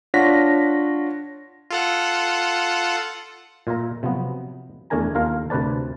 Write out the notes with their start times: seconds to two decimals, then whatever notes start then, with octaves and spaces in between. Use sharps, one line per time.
0.14 D4 F4 C#5 F#5 A#6 B6
1.71 F4 A4 F#5
3.67 A#2 F4 E5 A#5
4.03 C3 F3 F#3 B3
4.90 E2 A3 D4 A#4 G#5 A#5
5.14 D#2 F4 A4 A#4 F5
5.50 D2 C3 A#4 B4 D5 A5